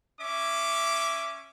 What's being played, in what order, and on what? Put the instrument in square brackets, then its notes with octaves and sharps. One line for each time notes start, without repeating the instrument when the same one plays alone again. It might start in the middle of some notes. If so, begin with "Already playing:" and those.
[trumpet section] C#4 E5 D6